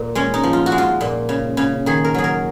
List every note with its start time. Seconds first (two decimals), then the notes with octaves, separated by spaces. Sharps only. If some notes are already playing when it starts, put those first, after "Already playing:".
Already playing: A#2
0.15 G#3 C#4
0.34 D#4
0.44 F3
0.53 F4
0.66 F#4
0.72 G#3
0.78 F4
1.01 A#2
1.29 C#3
1.57 C#3
1.86 D#3 G#4
2.04 A#4
2.14 F#3 G#4
2.24 A#4